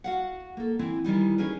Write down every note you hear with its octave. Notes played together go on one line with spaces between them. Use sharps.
F#4 F5 F#5
A#3 A4
E3 C4 E4
D#3 E3 G3 D#4
C#4 D#4 G#4 A#4 B4